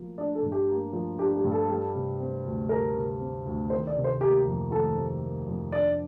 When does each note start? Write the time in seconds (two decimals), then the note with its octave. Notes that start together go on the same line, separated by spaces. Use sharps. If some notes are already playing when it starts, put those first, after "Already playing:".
Already playing: F3 A#3
0.18 D4 D5
0.35 A4
0.43 G2
0.52 G4
0.69 A#3
0.93 F3
1.18 D4 G4
1.36 G4
1.44 G2
1.52 A4
1.69 G3
1.94 C3
2.20 C4
2.45 D2
2.69 G3 A#4
2.96 C3
3.20 C4
3.46 D2
3.70 D#3 C5
3.87 D5
3.96 C3
4.04 C5
4.21 A#3 G4
4.47 F2
4.71 D#3 A4
4.96 C3
5.21 A#3
5.47 F2
5.72 D4 D5